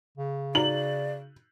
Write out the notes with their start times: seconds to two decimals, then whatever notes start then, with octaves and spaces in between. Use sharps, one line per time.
0.18 C#3
0.55 D#4 F#4 D5 A#5 F#7